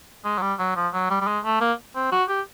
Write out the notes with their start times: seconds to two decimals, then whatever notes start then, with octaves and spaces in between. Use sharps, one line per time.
0.25 G#3
0.37 F#3
0.42 G3
0.59 F#3
0.76 F3
0.93 F#3
1.10 G3
1.21 G3
1.27 G#3
1.44 A3
1.60 A#3
1.95 C4
2.12 F#4
2.29 G4